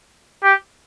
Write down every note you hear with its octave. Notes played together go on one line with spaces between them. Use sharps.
G4